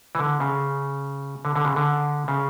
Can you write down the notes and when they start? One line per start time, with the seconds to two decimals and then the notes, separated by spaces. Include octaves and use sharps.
0.15 E3
0.19 D3
0.40 C#3
1.45 D3
1.56 D3
1.65 C#3
1.76 D3
2.28 C#3